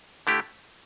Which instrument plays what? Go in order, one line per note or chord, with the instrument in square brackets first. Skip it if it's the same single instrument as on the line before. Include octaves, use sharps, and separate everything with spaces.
[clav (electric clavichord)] D3 A3 E4 G4